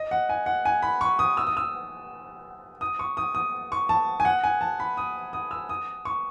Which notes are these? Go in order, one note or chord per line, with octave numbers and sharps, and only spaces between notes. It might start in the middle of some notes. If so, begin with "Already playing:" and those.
Already playing: D#5
F#5
G#5
F#5
G#5
B5
C#6
D#6
E6
D#6
E6
D#6
C#6
D#6
D#6
C#6
A5
G#5
F#5
G#5
A5
B5
D#6
D#6
E6
D#6
C#6